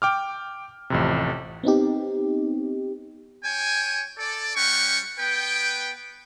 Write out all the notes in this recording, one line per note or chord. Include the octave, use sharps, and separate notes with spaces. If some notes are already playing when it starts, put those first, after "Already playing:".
G5 D6 F6
A1 F2 C3
B3 C4 D#4 G4
C#5 G5 G#5
A4 D5
G3 C#4 F#5 G5 C#6
B3 B4 G5